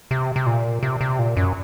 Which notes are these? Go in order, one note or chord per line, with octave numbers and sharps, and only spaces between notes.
C3
C3
A#2
C3
C3
A#2
F#2